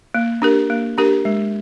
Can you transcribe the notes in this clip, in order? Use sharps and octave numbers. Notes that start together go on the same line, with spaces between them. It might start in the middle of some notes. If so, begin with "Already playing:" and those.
A#3
D4 G4 A#4
A#3
D4 G4 A#4
G#3